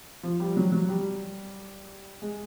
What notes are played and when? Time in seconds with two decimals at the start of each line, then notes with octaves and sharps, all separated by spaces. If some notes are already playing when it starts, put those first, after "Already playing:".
0.23 F3
0.40 G3
0.57 F#3
0.72 F#3
0.89 G3
2.22 G#3